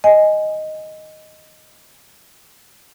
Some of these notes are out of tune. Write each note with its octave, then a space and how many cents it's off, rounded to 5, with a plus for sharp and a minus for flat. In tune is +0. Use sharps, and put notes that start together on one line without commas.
D#5 +0 G#5 +0